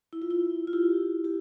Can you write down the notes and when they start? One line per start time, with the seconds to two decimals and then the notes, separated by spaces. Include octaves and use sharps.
0.13 E4
0.22 F4
0.31 E4
0.67 F4
0.73 E4 G4
1.24 G4